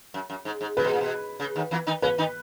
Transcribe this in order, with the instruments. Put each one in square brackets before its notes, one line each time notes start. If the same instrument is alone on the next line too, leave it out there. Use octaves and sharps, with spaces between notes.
[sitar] F#2
F#2
G#2
G#2
[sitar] C#3 [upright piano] B4
[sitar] B2
A#2
B2
C#3
D#2 D#3
E2 E3
D#3 D#4
[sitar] C#3 C#4 [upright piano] B4
[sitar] D#3 D#4